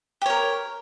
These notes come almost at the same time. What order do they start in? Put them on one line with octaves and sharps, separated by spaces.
G4 C#5 A#4